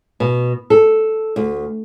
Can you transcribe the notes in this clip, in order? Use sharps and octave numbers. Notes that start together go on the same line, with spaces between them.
B2
A4
D2